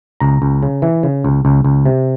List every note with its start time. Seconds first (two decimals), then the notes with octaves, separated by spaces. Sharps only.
0.20 C#2 A#5
0.42 C#2
0.63 C#3
0.82 E3
1.03 C#3
1.24 C#2
1.45 C#2
1.64 C#2
1.86 C3